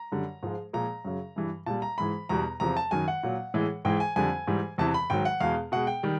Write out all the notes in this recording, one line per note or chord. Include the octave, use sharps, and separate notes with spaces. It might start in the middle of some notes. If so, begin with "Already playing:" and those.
Already playing: A#5
F#2 D3 G3
G#2 F3 G#3
A#2 F3 G#3 A#5
F#2 C#3 F#3
G2 E3 G3
A#2 G3 A5
A#5
G#2 E3 G#3 B5
E2 B2 G3 A#5
E2 C3 F3 A#5
A5
F#2 D#3 F#3 G#5
F#5
A#2 F#3
A2 E3 G#3
G#2 E3 G#3 G5
G#5
F2 D3 G3 G#5
G#2 E3 G3
E2 C3 E3 A5
B5
G#2 D#3 F#3 G5
F#5
E2 B2 G#3 F5
B2 G#3 F#5
G5
D#3 G3